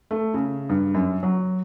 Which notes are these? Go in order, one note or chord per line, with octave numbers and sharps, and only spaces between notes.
A3
C#3
G2
F#2
F#3